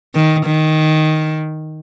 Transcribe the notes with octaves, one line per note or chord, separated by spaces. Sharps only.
D#3
D#3